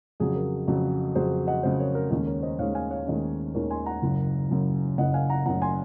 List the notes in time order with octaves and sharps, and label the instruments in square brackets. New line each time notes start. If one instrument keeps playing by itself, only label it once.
[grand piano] F2 C#3 F#3 G#4
A#4
F2 C#3 F#3
F2 C#3 F#3 G#4 C5
D#5 F#5
F2 C#3 F#3 C5 D#5
A#4 C#5
A#4
D#2 D#3 G#3 C#4 A#4
A#4 C#5
C5 D#5
D#2 D#3 G#3 C#4 C#5 F5
F5 G#5
C#5 F5
D#2 D#3 G#3 C#4
D#2 D#3 G#3 C#4 A#4 C#5
G#5 C6
F#5 A#5
F#1 F#2 C#3
F#1 F#2 C#3
F#1 F#2 C#3 D#5 F#5
F5 G#5
F#5 A#5
F#1 F#2 C#3 F#5 A#5
G#5 C6